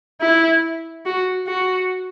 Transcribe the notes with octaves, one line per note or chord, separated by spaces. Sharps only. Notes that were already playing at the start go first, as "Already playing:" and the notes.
E4
F#4
F#4